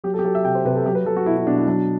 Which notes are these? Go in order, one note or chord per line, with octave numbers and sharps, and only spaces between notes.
F#3 G4
A4
G4
F#3 A4
E5
C3 G5
C5
C3 B4
A4
F#3 G4
B4
F#3 A4
F#4
B2 E4
E4
B2 D4
E4
F#3 D4